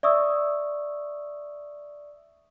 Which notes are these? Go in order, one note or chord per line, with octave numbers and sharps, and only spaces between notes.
D5 E5 C#6 D#6 E6